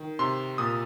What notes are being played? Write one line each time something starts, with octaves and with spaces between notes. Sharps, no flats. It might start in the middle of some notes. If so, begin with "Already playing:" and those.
Already playing: D#3
C3 C6
A#2 D#6